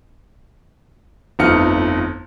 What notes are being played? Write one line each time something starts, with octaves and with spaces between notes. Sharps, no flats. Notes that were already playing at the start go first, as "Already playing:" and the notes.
G1 F2 A3 D#4 F6 C#7